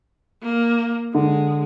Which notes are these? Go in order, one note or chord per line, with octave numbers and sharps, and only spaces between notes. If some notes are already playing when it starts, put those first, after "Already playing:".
A#3
D3 G#3